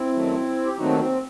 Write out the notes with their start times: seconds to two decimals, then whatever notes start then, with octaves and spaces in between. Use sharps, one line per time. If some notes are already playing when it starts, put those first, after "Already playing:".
Already playing: C4 E4
0.13 F#2 D#3 F#3 A3
0.65 G4
0.77 D#2 D#3 F#3 A3 C4 D#4 F#4
0.99 C4